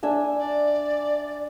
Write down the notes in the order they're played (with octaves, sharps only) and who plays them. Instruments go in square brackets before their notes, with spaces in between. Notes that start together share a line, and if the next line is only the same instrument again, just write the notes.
[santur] D4 E5 G#5
[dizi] D5